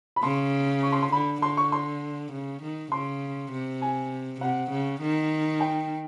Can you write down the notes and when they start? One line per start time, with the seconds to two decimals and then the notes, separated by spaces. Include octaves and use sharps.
0.16 B5
0.23 C#3 C6
0.83 C#6
0.92 C6
1.03 C6
1.12 D3 B5
1.42 D3 C6
1.57 C#6
1.72 C6
2.32 C#3
2.62 D#3
2.92 C#3 C6
3.52 C3
3.82 G#5
4.41 C3 F#5
4.71 C#3
5.01 D#3
5.60 G5